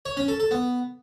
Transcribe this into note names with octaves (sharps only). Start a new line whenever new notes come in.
C#5
C#4
A4
A4
B3